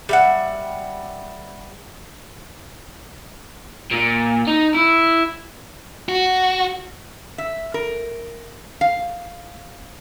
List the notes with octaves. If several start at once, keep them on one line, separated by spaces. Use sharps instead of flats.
G3 E5 F#5
A#2
D#4
E4
F#4
E5
A#4
F5